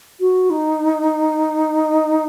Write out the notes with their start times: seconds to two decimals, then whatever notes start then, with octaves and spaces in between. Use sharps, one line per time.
0.20 F#4
0.50 D#4